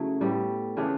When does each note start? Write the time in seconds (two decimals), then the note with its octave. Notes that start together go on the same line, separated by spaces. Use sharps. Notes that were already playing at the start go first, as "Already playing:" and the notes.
Already playing: C#3 F#3 A3 E4
0.21 A2 G3 B3
0.77 C#3 E3 B3 D4